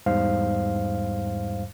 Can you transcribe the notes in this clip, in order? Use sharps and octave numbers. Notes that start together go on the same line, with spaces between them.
E2 G#2 G3 C5 F5